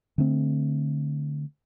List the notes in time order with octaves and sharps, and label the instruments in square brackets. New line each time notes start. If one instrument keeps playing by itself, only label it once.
[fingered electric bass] D3 A3 C4